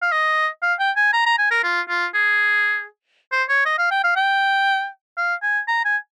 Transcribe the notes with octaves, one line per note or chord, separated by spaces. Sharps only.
F5
D#5
F5
G5
G#5
A#5
A#5
G#5
A#4
F4
F4
G#4
C5
C#5
D#5
F5
G5
F5
G5
F5
G#5
A#5
G#5